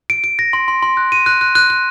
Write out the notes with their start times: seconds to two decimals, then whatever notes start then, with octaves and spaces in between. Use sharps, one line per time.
0.10 D7
0.24 D7
0.39 A#6
0.53 C6
0.68 C6
0.83 C6
0.97 F#6
1.12 D#7
1.26 F#6
1.41 F#6
1.55 F#6
1.70 F#6